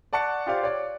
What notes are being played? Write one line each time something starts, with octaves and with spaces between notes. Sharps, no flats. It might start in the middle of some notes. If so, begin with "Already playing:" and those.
D5 F#5 A5 C#6 F#6 C#7
F4 G4 C5 D5 F5
C#5 D5